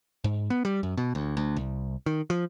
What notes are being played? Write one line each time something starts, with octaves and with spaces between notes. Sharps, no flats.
G#2
B3
G3
F#2
B2
D2
D2
C2
D#3
F3